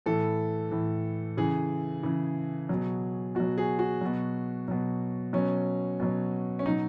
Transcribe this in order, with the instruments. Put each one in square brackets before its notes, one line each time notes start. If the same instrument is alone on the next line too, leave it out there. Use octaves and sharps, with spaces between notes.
[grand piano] A2 E3 A4
A2 E3
C#3 E3 G#4
C#3 E3
B2 F#3
B2 F#3 F#4
G#4
F#4
B2 F#3
B2 F#3
B2 F#3 C#4
B2 F#3
C#4
B2 F#3 D#4